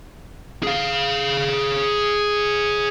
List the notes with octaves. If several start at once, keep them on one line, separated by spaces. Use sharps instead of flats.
G#4 F5